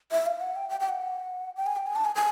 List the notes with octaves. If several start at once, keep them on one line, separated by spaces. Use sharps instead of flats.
E5
F5
F#5
G5
G5
G5
F#5
G5
G#5
G5
G#5
A5
G#5
G#5